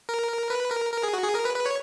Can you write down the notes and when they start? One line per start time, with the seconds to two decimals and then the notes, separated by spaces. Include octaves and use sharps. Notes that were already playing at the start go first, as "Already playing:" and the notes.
0.09 A#4
0.50 B4
0.72 A#4
0.93 A#4
1.03 G#4
1.13 F#4
1.24 G#4
1.34 A#4
1.45 B4
1.55 B4
1.66 C#5